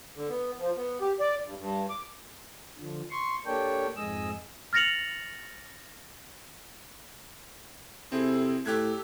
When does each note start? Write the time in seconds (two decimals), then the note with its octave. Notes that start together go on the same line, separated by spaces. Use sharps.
0.16 D3
0.29 B3
0.59 F3
0.77 B3
1.01 G4
1.20 D5
1.44 G2
1.59 G2
1.89 D6
2.78 D3 F3
3.10 C6 C#6
3.46 A#3 D4 G4 A4 C#5 G5
3.96 F2 G#2 G#4 D#5 E6
4.73 F6 A6 A#6 C#7 F7 F#7
8.12 C3 C4 E4 G#4 A4
8.66 A2 G4 A4 F#6 G#6